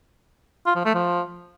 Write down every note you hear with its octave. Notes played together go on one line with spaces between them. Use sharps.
F4
F3
A3
F3